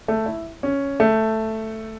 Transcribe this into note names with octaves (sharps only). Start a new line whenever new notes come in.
A3
E4
C#4
A3